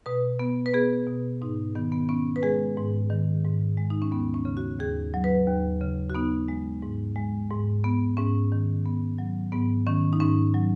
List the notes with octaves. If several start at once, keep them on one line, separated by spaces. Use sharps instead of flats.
B2 B4
B3
B4
B3 G#4
B2
G#2 D#4
D#3 B3
B3
B3 C#4
B4
G#3 G#4
G#2
D#3
G#2
G#3
D#4
C#4
D#2 B3
C#4
C#3
F#4
D#2 G#4
F#3
B4
D#2
C#3
F#4
B3 D#4
G#3
G#2
G#3
G#2
B3
G#2 C#4
D#3
B3
F#3
G#2 B3
D#3 C#4
D#4
G#2 C#4
F#3